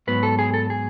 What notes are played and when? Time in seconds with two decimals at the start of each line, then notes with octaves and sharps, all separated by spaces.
0.07 G#2 F#3 B3 B4
0.23 A4
0.39 G#4
0.54 A4
0.70 G#4